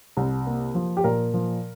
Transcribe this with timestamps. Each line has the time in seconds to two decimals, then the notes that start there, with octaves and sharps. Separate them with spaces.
0.17 C2
0.47 A#3
0.75 F3
0.97 G4
1.04 A#2 A#4
1.34 F3